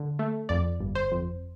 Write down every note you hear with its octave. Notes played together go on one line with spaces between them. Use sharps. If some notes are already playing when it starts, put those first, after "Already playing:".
Already playing: D3
A3
F2 D5
G1
C5
F2